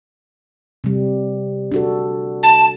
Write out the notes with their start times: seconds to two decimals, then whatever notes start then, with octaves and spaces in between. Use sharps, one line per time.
0.84 C3 G3
1.72 D4 F#4 A4
2.43 A5